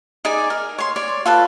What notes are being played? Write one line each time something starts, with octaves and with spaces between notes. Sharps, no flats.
D#4 G#4 D5
A#4
C#5 C6
C#5 D5
F4 A4 B4 A5